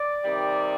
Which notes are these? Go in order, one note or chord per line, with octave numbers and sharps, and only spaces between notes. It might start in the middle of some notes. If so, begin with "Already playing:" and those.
Already playing: D5
C3 D#3 G3